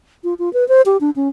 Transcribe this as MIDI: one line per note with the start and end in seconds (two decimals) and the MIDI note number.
0.24 0.34 65
0.39 0.52 65
0.53 0.67 71
0.68 0.82 72
0.86 0.97 67
1.01 1.10 62
1.16 1.28 61